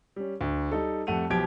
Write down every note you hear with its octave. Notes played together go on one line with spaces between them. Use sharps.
G3 C#4
D2
G3 D#4 A4
F2 G3 A3 F#5 D#7 F7
B1 B2 F3 G4 G#6 D7